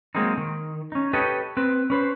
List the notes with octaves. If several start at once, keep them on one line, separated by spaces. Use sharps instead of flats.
F#3 G#3 A#3 C4 D#4
D#3
C#4 D#4
G4 A4 B4 C#5 D#5
C4 B4
C#4 B4 C5